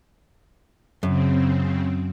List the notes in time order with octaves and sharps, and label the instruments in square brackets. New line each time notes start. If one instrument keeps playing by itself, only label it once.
[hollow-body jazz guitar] F#2 [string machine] C#3 C4